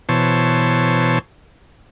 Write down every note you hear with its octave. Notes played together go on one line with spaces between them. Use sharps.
B2 E3 C5 C#5 A5